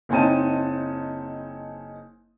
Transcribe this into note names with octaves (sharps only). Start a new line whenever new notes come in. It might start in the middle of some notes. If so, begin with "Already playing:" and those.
F#1 C4 C#4 D#4 A5 D#7